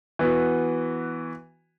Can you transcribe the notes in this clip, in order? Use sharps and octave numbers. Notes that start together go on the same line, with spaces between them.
E3 B3 F#4